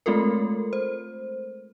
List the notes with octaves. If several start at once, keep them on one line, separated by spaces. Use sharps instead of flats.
G#3 A3 C4 F4 A4 A#4
C5